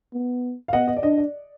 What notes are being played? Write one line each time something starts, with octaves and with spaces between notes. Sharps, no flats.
B3
F5
B3 D#5 F#5
D#5
D5
D4 D#5
D5